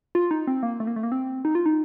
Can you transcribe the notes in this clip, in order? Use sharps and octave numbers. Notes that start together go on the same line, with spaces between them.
F4
D#4
C4
A#3
A3
A#3
A3
A#3
C4
D#4
F4
D#4